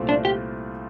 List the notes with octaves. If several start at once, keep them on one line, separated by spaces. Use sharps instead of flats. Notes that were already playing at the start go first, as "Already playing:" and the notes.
Already playing: C2 A#2 A3 C4 F4
D4
G4